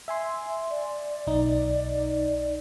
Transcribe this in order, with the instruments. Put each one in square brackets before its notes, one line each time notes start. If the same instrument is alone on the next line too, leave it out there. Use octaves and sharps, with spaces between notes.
[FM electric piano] E5 G#5 C6
[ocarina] D5
[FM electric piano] B1 D#4